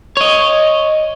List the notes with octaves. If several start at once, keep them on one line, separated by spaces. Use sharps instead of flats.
C#5 D#5